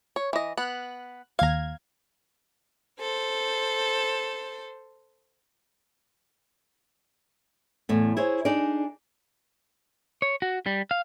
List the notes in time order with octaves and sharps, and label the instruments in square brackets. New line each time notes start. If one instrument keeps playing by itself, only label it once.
[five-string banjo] C#5
E3 D#5
[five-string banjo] B3 [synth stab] F#6
[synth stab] D#2 G#6 [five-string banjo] F5 A#5
[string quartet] A4 C5
[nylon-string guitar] E2 A2
E4 G#4 C5 C#5
D4 D#4 G#4 D5
[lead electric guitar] C#5
F#4
G3
F5